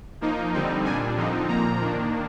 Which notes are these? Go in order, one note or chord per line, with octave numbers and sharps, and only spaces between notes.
F3 A#3 D#4
D3 G3 C4 D#4
A#2 G3 D4 G#5
D3 F3 C4 D#4
A#2 F3 A#3 A#5
D#3 A#3 D4